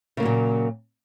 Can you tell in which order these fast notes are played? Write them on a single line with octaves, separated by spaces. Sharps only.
C#3 A#3 F#3 A#2